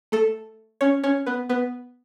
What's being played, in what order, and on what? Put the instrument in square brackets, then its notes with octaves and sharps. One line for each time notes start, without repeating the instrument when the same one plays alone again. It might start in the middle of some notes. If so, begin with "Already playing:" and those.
[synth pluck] A3 A4
C#4 C#5
C#4 C#5
B3 B4
B3 B4